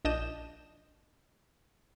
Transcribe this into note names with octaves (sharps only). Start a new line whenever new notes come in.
A#1 D4 D#5 D#6 G6 E7